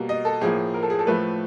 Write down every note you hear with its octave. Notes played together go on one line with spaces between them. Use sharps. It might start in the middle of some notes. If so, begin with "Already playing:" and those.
Already playing: B2 G3 A#3
D#5
A4
A2 F3 A#3 G#4
A#4
A4
G#4
A4
A2 F3 A3 B4